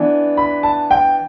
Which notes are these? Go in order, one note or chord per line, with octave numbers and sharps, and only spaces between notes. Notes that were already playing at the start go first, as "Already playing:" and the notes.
Already playing: E3 B3 D4
B5
A5
G5